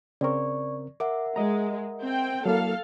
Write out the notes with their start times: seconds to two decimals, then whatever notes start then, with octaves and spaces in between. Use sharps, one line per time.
0.21 C#3 C4 A#4 D5 C#6
1.00 A#4 E5 F#5 D6
1.36 G#3 D#5 A#5
2.02 C4 G5
2.46 F#3 A#3 E4 A4 F5